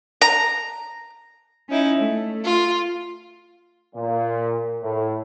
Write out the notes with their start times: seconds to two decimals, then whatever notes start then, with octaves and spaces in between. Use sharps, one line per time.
0.22 A#5
1.68 C#4 D#4 E4
1.98 A3
2.44 F4
3.95 A#2
4.82 A2